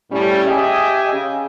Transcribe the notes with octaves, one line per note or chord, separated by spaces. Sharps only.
A2 G3 C#4
G4 G#4 D#5 E5 G5 G#5
C#3